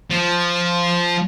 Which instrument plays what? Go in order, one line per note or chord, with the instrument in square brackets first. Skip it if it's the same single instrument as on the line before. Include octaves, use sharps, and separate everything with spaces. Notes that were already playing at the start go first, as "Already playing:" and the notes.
[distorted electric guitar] F3